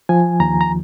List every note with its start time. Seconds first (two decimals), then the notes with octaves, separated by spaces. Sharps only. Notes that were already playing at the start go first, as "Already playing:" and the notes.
0.09 F3 G#5
0.40 D#2 A#5
0.61 A#5